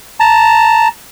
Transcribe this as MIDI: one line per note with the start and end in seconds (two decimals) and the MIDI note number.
0.20 0.88 81
0.20 0.88 82